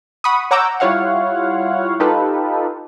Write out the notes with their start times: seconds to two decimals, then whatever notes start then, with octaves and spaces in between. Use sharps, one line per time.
0.24 F#5 B5 C#6 D#6
0.51 C#5 F#5 A#5 D6 E6 G6
0.80 G3 E4 F4 C#5 F5 F#5
2.00 D#4 F4 G4 A4 B4